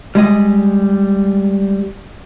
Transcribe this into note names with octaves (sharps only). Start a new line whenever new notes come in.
G3 G#3 D#5